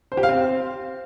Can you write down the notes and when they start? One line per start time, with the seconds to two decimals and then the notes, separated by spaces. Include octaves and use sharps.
0.12 C5
0.17 G4
0.23 F5
0.29 C4